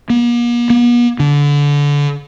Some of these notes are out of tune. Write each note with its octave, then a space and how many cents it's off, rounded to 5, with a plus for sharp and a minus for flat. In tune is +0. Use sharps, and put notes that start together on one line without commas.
A#3 +45
B3 -45
D3 -25